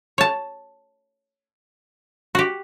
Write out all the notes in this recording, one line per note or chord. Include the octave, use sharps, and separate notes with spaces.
C#5 A5
F#4 G4